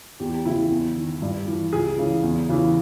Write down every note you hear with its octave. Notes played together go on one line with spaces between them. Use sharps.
E2 G4
C#3 E3 E4
E2
D#3
G2
E3
C#2 G#4
C#3 E3
E2
C#3 E3